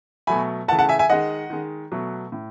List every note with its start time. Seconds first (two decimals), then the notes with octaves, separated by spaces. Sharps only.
0.27 B2 F#3 A3 G#5 B5
0.68 C#3 E3 A3 F#5 A5
0.79 F#5 A5
0.89 E5 G#5
0.99 E5 G#5
1.09 D#3 G#3 D#5 F#5
1.50 D#3 G#3
1.92 B2 F#3 A3
2.32 A2